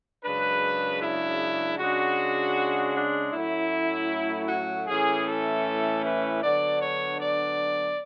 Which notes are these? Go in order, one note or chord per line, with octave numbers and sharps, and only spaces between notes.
F#2 C#3 G#3 D4 B4
E4
C#3 G#3 D4 F#4
D4
A2 F#3 A3 C#4 E4
F#4
A2 E3 A3 C#4 G#4
A4
B4
D3 F#3 B3 D4 D5
C#5
D5